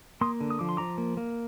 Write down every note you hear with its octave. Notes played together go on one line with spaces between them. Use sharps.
A#3 C6 D#6
D3
D#6
F3 D6
C6
F3 A#5 D6
A#3
A#3